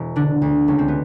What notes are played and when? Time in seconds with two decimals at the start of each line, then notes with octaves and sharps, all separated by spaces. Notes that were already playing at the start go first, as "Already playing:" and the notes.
Already playing: E1
0.16 D3 D4
0.42 D2
0.68 C#2 C#4
0.79 C4
0.88 B3